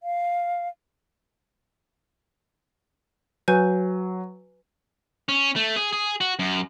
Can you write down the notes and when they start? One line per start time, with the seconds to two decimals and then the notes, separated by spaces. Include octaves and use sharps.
0.03 F5
3.48 F#3 B4 G#5 G6
5.29 C#4
5.56 A3
5.76 G#4
5.93 G#4
6.21 F#4
6.39 F#2